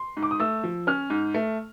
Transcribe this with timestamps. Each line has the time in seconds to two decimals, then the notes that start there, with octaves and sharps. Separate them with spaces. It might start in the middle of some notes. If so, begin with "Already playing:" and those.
Already playing: C6
0.17 G#2
0.23 D6
0.31 D#6
0.40 A3 E6
0.63 F3
0.87 C#4 F6
1.10 G#2
1.34 A3